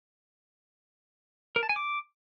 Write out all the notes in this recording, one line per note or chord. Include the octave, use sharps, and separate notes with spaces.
A#4
A5
G#5
D6